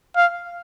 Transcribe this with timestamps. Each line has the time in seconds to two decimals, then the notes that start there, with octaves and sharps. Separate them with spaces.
0.16 F5